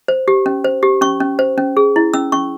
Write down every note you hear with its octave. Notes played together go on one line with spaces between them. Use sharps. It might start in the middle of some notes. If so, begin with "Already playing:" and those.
C5
G4
C#4
C5
G4
C#4 C#6
C#4
C5
C#4
G#4
E4
C#4 E6
C#4 C#6